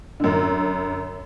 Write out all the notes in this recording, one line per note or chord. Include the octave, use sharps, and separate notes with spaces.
F#2 D3